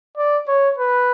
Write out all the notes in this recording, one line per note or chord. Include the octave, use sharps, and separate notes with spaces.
D5
C#5
B4